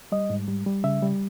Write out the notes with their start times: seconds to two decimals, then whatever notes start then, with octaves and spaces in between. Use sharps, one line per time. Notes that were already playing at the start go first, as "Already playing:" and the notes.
0.12 G3 D#5
0.30 G#2
0.48 G3
0.66 G3
0.84 C#3 E5
1.02 G3